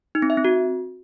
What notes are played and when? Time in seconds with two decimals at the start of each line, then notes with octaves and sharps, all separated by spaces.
0.15 D#4
0.22 C4
0.30 E5
0.37 C4
0.45 F#4